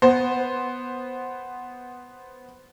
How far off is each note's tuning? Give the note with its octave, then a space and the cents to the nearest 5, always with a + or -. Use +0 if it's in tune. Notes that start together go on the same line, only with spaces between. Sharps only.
B3 +0 C5 +0